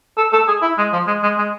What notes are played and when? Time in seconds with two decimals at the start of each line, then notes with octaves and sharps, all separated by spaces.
0.17 A4
0.33 A4
0.48 G#4
0.62 E4
0.78 G#3
0.93 F3
1.07 G#3
1.23 G#3
1.38 G#3